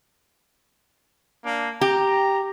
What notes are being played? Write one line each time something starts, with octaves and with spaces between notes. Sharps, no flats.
A#3 D4
G4 A#5